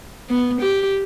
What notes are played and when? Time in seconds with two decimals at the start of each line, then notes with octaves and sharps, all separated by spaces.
0.29 B3
0.61 G4